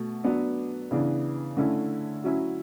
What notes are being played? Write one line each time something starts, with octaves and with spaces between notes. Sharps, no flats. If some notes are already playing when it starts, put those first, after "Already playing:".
Already playing: B2 A3
F#3 B3 D4
C#3 E3 B3 D4
D3 A3 C#4 E4
F#3 C#4 E4